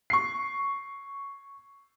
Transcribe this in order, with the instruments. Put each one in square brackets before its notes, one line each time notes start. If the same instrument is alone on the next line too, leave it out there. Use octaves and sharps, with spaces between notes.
[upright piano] C#6 C7